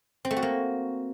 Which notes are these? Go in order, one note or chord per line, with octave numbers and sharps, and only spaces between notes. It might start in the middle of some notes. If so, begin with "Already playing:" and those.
C4
A3
F#4
A#3